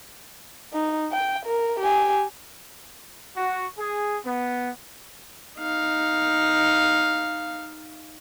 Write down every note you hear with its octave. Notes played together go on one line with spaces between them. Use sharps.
D#4
G5
A#4
G4 G#5
F#4
G#4
B3
D#4 F5